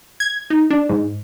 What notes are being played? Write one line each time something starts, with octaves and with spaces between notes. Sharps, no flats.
G#6
D#4
D4
G#2